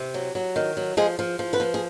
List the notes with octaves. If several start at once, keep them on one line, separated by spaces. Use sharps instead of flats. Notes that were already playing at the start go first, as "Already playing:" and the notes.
Already playing: C3
F#3
F#3
D#3
F#3
F3 G#3 G#4
F3
F3
B3 B4
F3
G#4